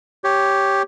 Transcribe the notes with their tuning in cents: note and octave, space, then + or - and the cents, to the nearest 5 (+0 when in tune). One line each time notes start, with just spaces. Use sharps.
G4 +0 C#5 +0